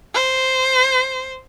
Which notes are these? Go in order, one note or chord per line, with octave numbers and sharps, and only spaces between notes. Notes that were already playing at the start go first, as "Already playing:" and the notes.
C5